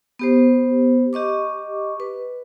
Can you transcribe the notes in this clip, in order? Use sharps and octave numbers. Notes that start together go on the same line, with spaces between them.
B3 G4 C5
G4 D#5 C#6 D6
B4